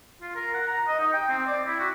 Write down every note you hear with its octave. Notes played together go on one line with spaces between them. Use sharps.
F4
A#4
F#5
A#5
D#5
D#4
G5
C4
D5
E4
F#4